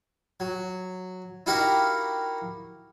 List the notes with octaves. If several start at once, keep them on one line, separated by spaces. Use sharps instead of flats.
F#3
D#4 E4 F#4 G4 A#4 F5